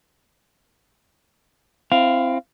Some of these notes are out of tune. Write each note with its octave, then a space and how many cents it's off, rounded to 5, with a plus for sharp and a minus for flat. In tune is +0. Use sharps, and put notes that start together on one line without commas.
C4 +0 E4 +25 F5 +0